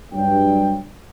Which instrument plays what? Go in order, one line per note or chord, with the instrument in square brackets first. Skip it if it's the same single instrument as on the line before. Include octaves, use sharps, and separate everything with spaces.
[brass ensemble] G2 F#3 G5